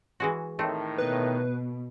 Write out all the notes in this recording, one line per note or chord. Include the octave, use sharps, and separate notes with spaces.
E3 G#3 F#4
A2 D#3 A3 C4
B2 B4